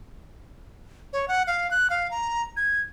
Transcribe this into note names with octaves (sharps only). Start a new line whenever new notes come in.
C#5
F#5
F5
F#6
F5
A#5
G#6